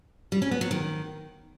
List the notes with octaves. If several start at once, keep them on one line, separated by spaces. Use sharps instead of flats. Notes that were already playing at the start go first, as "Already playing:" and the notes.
G3
C#4
B3
F#3
D#3